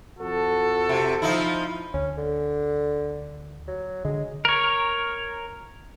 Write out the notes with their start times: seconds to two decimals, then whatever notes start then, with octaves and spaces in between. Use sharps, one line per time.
0.19 F2 F#4 A4
0.89 C3
1.22 F3 D#4 E4
1.94 D2 C#4
2.18 D3
3.68 F#3
4.05 D3 G#3
4.45 A#4 C#5